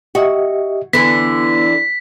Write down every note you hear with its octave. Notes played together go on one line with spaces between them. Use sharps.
F#4 G4 D#5 E5
D3 E3 B3 B6